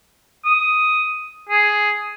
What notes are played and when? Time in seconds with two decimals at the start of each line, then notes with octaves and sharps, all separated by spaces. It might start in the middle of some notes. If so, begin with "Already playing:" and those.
0.46 D#6
1.49 G#4